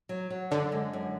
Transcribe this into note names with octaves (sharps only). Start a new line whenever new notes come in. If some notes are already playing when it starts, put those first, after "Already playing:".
F#3
F#3
F#2 D3
G#3
F#2